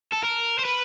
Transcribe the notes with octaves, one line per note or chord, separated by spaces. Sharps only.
A4
A#4
C5
B4